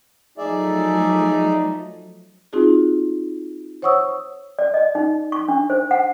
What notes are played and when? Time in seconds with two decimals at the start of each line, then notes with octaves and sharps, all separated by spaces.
0.38 F3 F#3 A3 D#4 G#4 D5 E5
2.53 C4 D#4 F4 F#4 G#4
3.82 C5 C#5 F#5 C#6 D#6 E6
4.59 D5
4.74 D#5
4.95 D#4
5.32 C#6
5.48 D4
5.70 C5
5.91 F#5